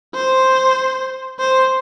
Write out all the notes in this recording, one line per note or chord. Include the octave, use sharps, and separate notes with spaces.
C5
C5